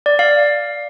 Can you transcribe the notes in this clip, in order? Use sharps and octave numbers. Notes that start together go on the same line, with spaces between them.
D5
F5